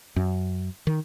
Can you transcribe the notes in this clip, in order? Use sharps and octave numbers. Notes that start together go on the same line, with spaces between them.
F#2
D#3